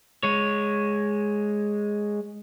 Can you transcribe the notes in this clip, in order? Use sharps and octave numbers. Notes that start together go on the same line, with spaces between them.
G#3 C#5